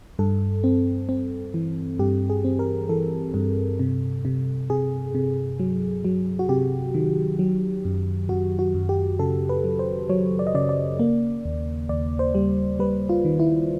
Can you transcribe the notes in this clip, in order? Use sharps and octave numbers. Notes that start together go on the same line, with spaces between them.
G2 A4
C4
C4
E3
G2 G4
G#4
C4
A#4
E3 A4
G2
C3
C3
C3 G#4
C3
F#3
F#3
F#4
C3 G4
D#3
F#3
F#2
F#2 F#4
F#4
F#2
G4
C#3 A4
B4
F#3
C5
F#3 C#5
D5
D#5
C#3 D5
D5
A#3
D#2
D#2 D5
C5
G3
G3 B4
F4
D#3
E4